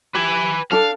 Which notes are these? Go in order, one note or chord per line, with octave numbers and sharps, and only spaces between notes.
G4 B4 G#5
D4 A4 F5